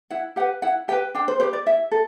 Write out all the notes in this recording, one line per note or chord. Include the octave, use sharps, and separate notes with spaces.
E4 F#5
G4 B4 F#5
E4 F#5
G4 B4 G5
D4 G5
C5
G4 B4 C5
D5
E4 E5
A4